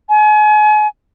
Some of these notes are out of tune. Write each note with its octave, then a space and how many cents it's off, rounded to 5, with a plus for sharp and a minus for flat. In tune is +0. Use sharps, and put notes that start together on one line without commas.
G#5 +35